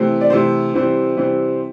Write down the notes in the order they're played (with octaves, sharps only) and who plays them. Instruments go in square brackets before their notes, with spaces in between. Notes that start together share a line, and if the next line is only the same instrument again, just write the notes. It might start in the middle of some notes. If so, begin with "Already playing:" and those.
Already playing: [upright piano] C3 E3 A3 C4
D5
C3 E3 A3 C4 C5
C3 E3 G3 C4
C3 E3 G3 C4